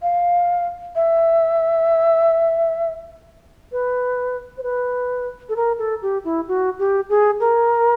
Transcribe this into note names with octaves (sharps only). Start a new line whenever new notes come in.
F5
E5
B4
C5
B4
A4
A#4
A4
G4
E4
F#4
G4
G#4
A#4